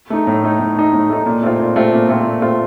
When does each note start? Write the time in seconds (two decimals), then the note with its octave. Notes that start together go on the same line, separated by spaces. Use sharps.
0.10 A3 D#4
0.27 A2
0.44 A3 D#4
0.59 A2
0.76 A3 D#4
0.93 A2
1.10 A3 D#4
1.26 A#2
1.43 A3 C4 F4
1.60 A#2
1.76 A3 C4 F4
1.92 A#2
2.09 A3 C4 F4
2.25 A#2
2.42 A3 C4 F4